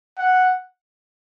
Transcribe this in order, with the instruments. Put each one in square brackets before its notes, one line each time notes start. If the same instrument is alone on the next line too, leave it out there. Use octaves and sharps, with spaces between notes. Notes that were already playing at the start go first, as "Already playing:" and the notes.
[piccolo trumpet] F#5